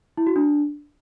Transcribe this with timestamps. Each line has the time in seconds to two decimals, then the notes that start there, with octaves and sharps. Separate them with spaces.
0.17 E4
0.27 F#4
0.36 D4